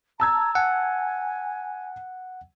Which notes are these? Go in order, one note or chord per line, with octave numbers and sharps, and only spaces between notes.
A5 A#5 E6 G#6
F#5 G#5